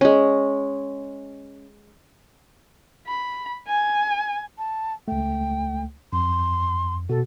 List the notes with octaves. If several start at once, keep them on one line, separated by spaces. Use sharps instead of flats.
G#3 C#4
B5
G#5
A5
C#2 A3 G5
F2 C6
B2 F#4 A4